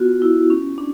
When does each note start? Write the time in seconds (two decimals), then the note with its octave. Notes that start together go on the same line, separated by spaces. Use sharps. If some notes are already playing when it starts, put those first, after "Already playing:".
Already playing: B3 F4 F#4
0.22 E4
0.50 C#4
0.78 D4